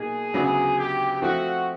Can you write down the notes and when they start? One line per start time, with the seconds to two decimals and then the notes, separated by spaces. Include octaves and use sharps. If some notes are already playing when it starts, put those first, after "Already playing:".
Already playing: B2 F#3 A#3 D#4 G#4
0.34 D2 C#3 F#3 B3 D4
0.78 G4
1.22 F3 A3 C4 F#4